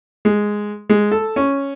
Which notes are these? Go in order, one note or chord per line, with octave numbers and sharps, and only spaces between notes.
G#3
G#3
A4
C#4